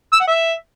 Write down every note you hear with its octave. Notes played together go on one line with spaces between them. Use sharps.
E6
F#5
E5